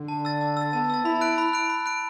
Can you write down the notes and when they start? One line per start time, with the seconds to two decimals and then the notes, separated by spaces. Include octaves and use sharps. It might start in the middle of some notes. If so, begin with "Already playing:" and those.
Already playing: D3
0.08 A5
0.25 E6 A6
0.41 A5
0.57 E6 A6
0.73 B3 A5
0.90 E6 A6
1.05 E4 B5
1.21 F#6 D7
1.38 B5
1.53 F#6 D7
1.70 B5
1.86 F#6 D7